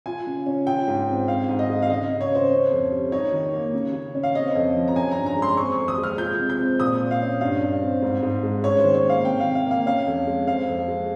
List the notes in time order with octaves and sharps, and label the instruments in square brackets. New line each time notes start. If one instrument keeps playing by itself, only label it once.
[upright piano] F4 G#5
C#3
C#4
F4 G5
G#2
C4
C4 F5
G#2
D#5
G#3
F5
C#3 D#5
C#3
C#5
C#4 C5
C#4
F2
G3
D#4 C#5
D#3
A#3
C#3
C#3
C#4
F5
C4 D#5
F2
F3
A#5
C#4 G#5
G2 A#5
A#5
G#3
C6
C4 C#6
C#6
F2
D#6
G#3
F6
F4 G6
C3
G6
C4
A#2 D#6
A#2
F5
C#4
G2 F5
G2
C4
G#2
G#2
G#3
C#4 C#5
C5
D#3
C#5
A#3
F5
C3 G5
F5
C3
F5
A#3 F5
C#4 F5
F2
G#3
C4 F5
F2
G#3